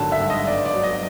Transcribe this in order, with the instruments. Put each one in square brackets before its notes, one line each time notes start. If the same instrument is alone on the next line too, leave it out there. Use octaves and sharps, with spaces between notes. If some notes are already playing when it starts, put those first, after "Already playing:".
Already playing: [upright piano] G#1 D3 F#3 A5
E5
G2
D#5
G1 D5
D5
F#3
D#5